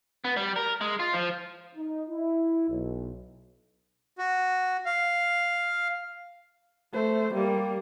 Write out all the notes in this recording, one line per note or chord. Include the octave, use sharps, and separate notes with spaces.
B3
G3
A#4
G#3
F4
F3
D#4
E4
B1
F#4
F5
A3 C5
G3 A#3